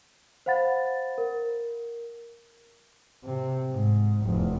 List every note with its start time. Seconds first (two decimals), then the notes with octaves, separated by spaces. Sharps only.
0.46 C5 F5 F#5 B5 A6
1.18 A#4
3.24 C3
3.72 G#2
4.24 F1 E2